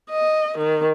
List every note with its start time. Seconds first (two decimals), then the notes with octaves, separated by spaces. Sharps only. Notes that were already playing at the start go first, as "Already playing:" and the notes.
0.11 D#5
0.58 D#3